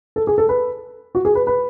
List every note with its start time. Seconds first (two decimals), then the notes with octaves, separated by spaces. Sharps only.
0.16 A4
0.27 G#4
0.38 A4
0.49 B4
1.15 F#4
1.25 G#4
1.35 B4
1.47 B4